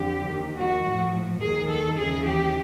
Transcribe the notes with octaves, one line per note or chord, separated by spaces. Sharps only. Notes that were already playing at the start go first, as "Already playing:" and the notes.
Already playing: F2 D3 F3 G4
D#2 D#3
F#4
A2 F3
D#2 D#3 G#4
A4
D#2 C#3 E3 G#4
G4